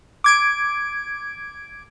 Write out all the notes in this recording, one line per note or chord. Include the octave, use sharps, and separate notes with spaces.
D6 G#6 D7